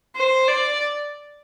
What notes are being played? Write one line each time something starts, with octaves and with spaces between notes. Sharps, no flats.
C5
D5